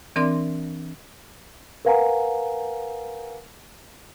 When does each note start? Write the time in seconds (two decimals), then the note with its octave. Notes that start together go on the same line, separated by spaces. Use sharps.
0.16 E3 C4 D4 A#4 D5 C6
1.85 A#4 B4 F5 F#5 G#5 A#5